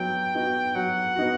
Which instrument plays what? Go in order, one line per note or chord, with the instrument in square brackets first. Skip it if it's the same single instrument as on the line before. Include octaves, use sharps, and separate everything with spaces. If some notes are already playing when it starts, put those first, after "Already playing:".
Already playing: [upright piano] F#3 B3 D#4 [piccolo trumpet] G5
[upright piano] B3 D#4 F#4
[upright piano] F#3 [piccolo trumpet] F#5
[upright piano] B3 D#4 F#4